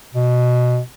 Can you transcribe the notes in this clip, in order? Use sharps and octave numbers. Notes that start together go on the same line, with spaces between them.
B2